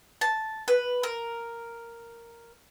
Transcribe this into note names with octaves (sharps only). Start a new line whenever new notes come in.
A5
B4
A#4